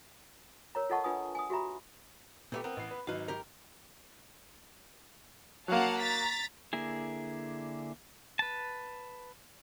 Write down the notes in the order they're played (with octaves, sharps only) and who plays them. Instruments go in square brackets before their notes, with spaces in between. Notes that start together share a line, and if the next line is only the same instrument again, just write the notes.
[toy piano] A#4 C#5 A#5
F4 A4 D#5 F#5 A5 C#6
D4 F4 B4 G#5 D#6
G#5 D#6
F#4 G4 E5 A#5 B5
[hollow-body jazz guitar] A#2 A3 G4 [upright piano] B3
[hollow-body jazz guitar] B3 [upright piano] C4 A#4
[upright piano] A1 C7
B4
[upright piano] G#1 F#3 D#4 [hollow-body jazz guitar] B4 F5
[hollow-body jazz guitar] G4 A#4
[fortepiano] F#3 A#3 [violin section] F5 F#5 A5
[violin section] A#5 A6 B6
[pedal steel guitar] D3 A#3 E4 G#4
B4 A5